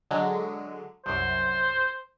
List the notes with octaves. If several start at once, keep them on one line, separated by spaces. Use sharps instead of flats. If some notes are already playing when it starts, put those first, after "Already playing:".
D3 F#3 G#3
C2 F#2 C5